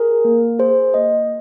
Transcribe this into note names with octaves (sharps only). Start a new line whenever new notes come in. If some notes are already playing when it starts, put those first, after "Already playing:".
Already playing: G#4 A#4
A#3
G#4 C5
A#3 D#5